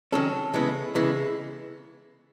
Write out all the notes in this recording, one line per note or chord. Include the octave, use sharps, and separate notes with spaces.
D#3 F#3 C#4 A4
C#3 E3 G#3 B3
C#3 E3 G#3 B3